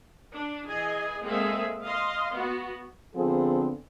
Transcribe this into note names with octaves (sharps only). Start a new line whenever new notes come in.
D4
E3 G#4 D#5 G#5
G#3 A#3 C4 G#4 A4 E5
D#5 F5 C6
B3 F#4
D3 F3 B3 C4 G#4 A4